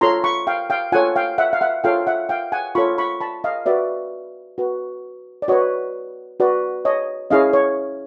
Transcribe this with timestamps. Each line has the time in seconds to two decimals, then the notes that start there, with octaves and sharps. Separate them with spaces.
0.01 F4 A4 C#5 A#5 C6
0.24 B5 C#6
0.47 F5 G5
0.70 F5 G5
0.92 F4 A4 C#5 F#5 G#5
1.16 F5 G5
1.38 E5 F#5
1.53 F5
1.61 E5 F#5
1.84 F4 A4 C#5 F5 G5
2.07 E5 F#5
2.29 F5 G5
2.52 F#5 G#5
2.75 F4 A4 C#5 B5 C#6
2.98 B5 C#6
3.21 A5 B5
3.44 D#5 F5
3.66 F#4 B4 D5 E5
4.58 F#4 B4
5.42 D5
5.48 F#4 B4 C#5 D#5
6.40 F#4 B4 D5
6.85 C#5 D#5
7.30 C#4 E4 G#4 C#5 D#5 F5
7.53 C#5